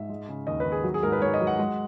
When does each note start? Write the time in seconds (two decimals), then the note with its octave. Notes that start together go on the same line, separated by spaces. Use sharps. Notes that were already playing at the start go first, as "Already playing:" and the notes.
Already playing: G#2 E5
0.09 G#3
0.29 C#3
0.47 D#2 D#5
0.60 B4
0.65 D#2
0.72 G#4
0.84 F#3
0.94 G#4
1.03 G#2 A#4
1.12 B4
1.21 G#2 C#5
1.34 D#5
1.41 F#3
1.47 F#5
1.59 G#3